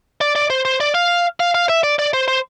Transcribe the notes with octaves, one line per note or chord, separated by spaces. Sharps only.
D5
D5
C5
C5
D5
F5
F5
F5
E5
D5
D5
C5
C5